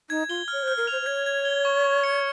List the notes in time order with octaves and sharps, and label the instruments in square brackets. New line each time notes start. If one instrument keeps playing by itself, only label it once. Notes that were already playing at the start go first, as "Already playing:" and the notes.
[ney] D#4 [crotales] G#6
[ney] F4 [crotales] G7
[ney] C#5 [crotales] F6
[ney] C5 [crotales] F6
[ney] A#4
[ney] C5 [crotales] F7
[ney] C5
[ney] C#5 [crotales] G#6
[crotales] G#6
G7
C#6
C#6
C#7